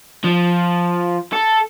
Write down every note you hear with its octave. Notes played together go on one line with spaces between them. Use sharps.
F3
A4